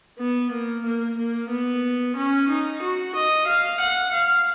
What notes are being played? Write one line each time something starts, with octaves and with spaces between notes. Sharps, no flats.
B3
A#3
A#3
A#3
B3
C#4
D#4
F#4
D#5
F5
F#5
F5